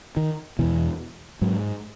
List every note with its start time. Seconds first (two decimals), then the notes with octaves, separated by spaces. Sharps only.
0.17 D#3
0.59 E2 B2 E3
1.41 G#2 F#3